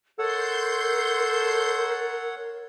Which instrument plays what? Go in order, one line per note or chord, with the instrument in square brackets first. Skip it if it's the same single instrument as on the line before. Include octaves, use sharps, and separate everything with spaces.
[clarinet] A4 [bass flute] A#4 [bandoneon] C#5 F#5 [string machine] C6 G6 C7